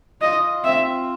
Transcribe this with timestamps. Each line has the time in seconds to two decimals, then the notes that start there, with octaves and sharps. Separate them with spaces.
0.21 F4 D#5
0.64 C4 E5